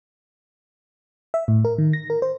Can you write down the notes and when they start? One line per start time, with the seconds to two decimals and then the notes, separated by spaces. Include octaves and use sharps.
1.34 E5
1.48 A2
1.65 A#4
1.78 D#3
1.93 A#6
2.10 A#4
2.22 C5